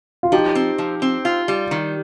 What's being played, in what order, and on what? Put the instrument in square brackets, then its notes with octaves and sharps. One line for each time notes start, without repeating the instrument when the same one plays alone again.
[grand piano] F4
[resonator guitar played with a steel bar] F3 [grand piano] D#4 G4
[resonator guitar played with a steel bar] C4
F3
C4
F4
G3
D#3